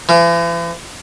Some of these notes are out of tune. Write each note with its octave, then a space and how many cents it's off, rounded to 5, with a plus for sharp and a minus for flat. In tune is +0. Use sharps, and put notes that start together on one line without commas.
E3 +45